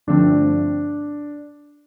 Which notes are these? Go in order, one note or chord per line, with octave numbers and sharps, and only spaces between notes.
G2 D3 F3 A3 C4 D4